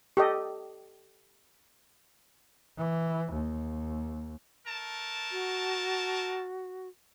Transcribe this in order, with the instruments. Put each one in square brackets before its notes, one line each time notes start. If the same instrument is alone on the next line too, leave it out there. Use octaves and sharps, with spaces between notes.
[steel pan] G4 A4 D#5
[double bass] E3
D#2
[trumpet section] A3 A#4 A5
[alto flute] F#4